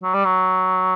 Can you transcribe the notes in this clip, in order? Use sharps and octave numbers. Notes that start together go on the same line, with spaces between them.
F#3
G3
F#3